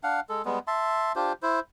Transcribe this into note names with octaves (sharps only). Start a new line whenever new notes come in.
D4 F5 F#5
G#3 A4
G3 G#3 B3
E5 A5 C6
D4 F4 G4 C5
E4 C5